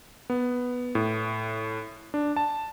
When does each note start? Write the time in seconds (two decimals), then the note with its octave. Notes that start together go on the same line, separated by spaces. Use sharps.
0.30 B3
0.95 A2
2.14 D4
2.36 A5